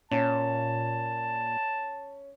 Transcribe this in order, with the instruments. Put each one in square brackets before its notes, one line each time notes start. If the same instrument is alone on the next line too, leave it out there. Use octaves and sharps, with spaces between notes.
[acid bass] A#2 [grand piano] C#4 [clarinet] A5